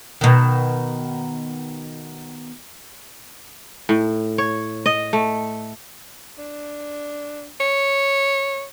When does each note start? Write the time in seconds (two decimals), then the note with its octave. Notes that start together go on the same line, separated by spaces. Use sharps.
0.21 B2 D#3
3.89 A2
4.38 C#5
4.86 D#5
5.13 A3
6.38 D4
7.60 C#5